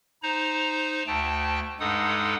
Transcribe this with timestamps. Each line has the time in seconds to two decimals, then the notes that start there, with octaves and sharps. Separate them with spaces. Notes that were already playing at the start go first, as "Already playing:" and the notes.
0.23 D#4 C5 A#5
1.07 D2 A3 G5 A5
1.80 G2 G#3 D#4 A4 F#5 D#6